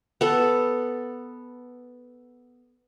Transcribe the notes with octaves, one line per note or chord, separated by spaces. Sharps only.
B3 A4